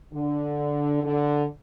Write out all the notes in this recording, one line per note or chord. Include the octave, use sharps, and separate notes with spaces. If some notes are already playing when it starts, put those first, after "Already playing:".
D3
D3